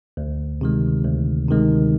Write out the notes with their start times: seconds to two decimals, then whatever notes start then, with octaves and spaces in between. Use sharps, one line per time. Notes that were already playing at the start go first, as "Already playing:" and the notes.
0.17 D2
0.61 C3 D#3 G#3
1.05 D2
1.48 C3 D#3 G#3